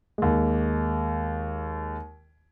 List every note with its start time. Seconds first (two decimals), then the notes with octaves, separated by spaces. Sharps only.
0.18 D#2 G#3